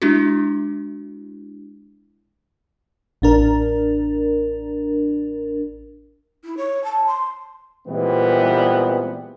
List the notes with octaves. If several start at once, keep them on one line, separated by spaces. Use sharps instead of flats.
G#3 D4 E4 F#4
A1 D4 A#4
E4
C#5
A5
C6
A#2 E3 G3 G#3 B3 C4